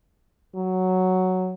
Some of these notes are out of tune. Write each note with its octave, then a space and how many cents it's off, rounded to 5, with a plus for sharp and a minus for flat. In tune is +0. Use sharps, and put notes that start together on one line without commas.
F#3 +0